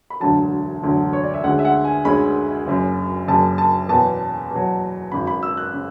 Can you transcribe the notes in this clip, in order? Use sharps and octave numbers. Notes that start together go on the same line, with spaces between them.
B5
E1 D2 D3 F#3 A5
E1 D2 D3 F#3
C#5
D5
E5
D2 D3 G#3 C#4 F#5
E5
F#5
G#5
D2 D3 G#3 C#4 B5
F#1 F#2 C#3
F#1 F#2 C#3 A5
A5
E2 B2 F#3 A5
E2 B2 F#3
G#1 F#2 C#3 B5
B5
E6
F#6
C#3